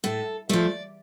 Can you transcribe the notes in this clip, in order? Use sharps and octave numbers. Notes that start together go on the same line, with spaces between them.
A2 A4
F3 A3 D5